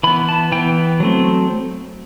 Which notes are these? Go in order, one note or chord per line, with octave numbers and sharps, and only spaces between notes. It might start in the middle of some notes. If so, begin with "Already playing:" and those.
E3 B3 B5
A5
E3 B3 G5
F#3 A3 C4